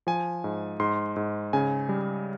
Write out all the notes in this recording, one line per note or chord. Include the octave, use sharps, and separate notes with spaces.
F3 G#5
G#2
G#2 C6
G#2
C#3 G#5
G3